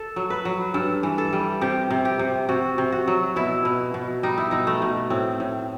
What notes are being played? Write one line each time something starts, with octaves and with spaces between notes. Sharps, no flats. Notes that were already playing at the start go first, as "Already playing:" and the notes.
Already playing: A4
F#3
B4
F#3
G2 A4
E3
A4
G3
C3 G4
C3
G4
C3
C3 F#4
C3
F#4
F#3
B2 E4
B2
B2
G3 D#4
E4
B2 D#4
A3
B2
A2 C4
A2